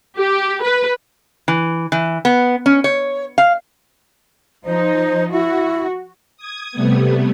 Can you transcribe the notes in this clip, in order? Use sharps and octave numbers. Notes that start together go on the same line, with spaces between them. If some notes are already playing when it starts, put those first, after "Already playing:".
G4
B4
E3
E3
B3
C#4
C#5
F5
F3 D#4 C5
E4 F#4
D#6 G#6
C3 G3 A3 B3